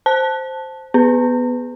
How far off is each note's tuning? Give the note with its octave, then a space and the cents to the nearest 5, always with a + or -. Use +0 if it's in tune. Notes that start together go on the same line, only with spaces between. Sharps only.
C5 +0 A5 +0
B3 +0 B4 +20